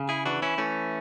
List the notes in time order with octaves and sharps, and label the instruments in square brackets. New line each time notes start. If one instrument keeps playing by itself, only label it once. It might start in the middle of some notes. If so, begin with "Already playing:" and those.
Already playing: [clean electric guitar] C#3
E4 G#4
E3 D4 F#4
C#4 E4
E3 A3 C#4